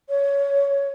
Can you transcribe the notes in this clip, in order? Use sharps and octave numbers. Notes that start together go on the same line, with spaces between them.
C#5